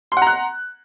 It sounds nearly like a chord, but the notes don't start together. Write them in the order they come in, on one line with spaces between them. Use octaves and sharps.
C6 F#5 A#5 F#6